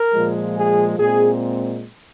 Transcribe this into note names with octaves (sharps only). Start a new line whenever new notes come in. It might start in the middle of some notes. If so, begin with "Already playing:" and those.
Already playing: A#4
A#2 F3 G#3
G#4
A#2 G#3 C4 G#4